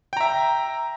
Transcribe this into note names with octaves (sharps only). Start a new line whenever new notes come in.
E5 G5 A#5